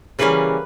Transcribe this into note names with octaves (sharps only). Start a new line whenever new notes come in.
C#3 E3 G3 A#3 C#4 B4